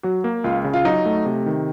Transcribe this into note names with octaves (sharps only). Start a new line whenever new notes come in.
F#3 F#4
A#3
C#2 F4
C#3
F4
F#3 D#4
A3
C3
D#3